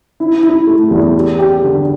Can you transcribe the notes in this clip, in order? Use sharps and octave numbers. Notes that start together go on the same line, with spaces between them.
E4
E4
A3
E2
G4
G4
D3